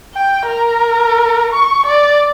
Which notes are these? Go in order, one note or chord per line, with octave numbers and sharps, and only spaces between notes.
G5
A#4
C#6
D5